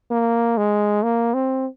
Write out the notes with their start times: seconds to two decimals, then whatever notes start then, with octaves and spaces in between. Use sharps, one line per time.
0.11 A#3
0.57 G#3
1.03 A#3
1.34 C4